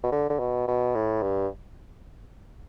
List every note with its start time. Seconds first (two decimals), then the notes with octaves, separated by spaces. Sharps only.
0.03 B2
0.12 D3
0.30 D3
0.39 B2
0.68 B2
0.95 A2
1.23 G2